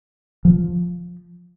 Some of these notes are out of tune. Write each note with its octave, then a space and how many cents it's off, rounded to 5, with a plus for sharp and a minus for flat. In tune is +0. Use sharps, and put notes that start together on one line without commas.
F3 +5